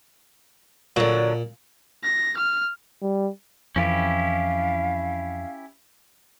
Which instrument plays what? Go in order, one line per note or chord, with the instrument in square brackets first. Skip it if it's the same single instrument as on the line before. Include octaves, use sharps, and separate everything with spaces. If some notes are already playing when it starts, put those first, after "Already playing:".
[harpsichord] A#2 [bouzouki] D3 F#3
[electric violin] A#6
F6
[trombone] G3
[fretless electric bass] F2 E3 [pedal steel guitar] C#4 E4 G4 [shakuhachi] F5